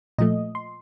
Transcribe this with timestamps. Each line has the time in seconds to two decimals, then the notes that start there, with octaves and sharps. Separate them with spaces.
0.18 A#2 F3 A3 D#5
0.55 C6